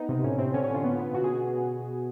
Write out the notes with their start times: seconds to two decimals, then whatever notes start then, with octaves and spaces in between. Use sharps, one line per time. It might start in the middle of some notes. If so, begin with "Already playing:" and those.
Already playing: B3 D#4
0.09 C3
0.24 A2 C#4
0.39 A2 C4
0.54 D3 C#4
0.64 C#4
0.69 D3
0.74 F4
0.84 B3
0.99 B3
1.14 B2 F#4
1.24 G#4